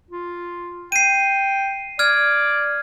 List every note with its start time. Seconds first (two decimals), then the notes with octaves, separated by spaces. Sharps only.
0.11 F4
0.92 G5 C7 D#7
1.99 D5 F6 G#6